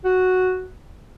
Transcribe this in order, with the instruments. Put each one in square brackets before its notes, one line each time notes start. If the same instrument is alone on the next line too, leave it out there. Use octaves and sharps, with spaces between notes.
[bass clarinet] F#4